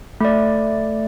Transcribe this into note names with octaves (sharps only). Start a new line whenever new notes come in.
A3 D5